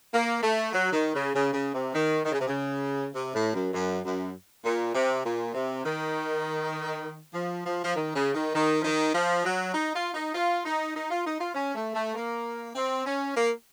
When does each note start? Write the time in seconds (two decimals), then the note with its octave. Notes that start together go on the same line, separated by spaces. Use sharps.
0.14 A#3
0.43 A3
0.73 F#3
0.93 D#3
1.14 C#3
1.34 C#3
1.53 C#3
1.74 C3
1.93 D#3
2.24 D#3
2.32 C#3
2.40 C3
2.47 C#3
3.13 C3
3.34 A2
3.54 F#2
3.73 F#2
4.04 F#2
4.64 A#2
4.94 C3
5.24 A#2
5.54 C3
5.85 D#3
7.34 F3
7.65 F3
7.84 F3
7.95 D#3
8.15 C#3
8.35 D#3
8.55 D#3
8.81 F3
8.84 D#3
9.14 F3
9.45 F#3
9.74 D#4
9.95 F4
10.14 D#4
10.35 F4
10.65 D#4
10.95 D#4
11.11 F4
11.25 D#4
11.40 F4
11.55 C#4
11.75 A3
11.95 A3
12.15 A#3
12.75 C4
13.06 C#4
13.36 A#3